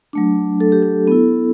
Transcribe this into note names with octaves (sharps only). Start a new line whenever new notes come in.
F#3 A3 D4
A4
G4
A4
B3 E4